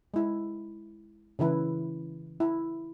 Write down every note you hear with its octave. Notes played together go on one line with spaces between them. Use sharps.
G#3 E4
C#3 E3 E4 B4
E4